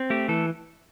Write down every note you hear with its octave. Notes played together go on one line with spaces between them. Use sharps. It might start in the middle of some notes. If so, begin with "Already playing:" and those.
Already playing: C4
A3 G4
E3 A4